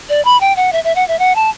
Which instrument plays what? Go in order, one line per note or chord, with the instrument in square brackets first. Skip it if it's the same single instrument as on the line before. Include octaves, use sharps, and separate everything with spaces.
[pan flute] D5
B5
G5
F#5
E5
E5
F#5
E5
F#5
A5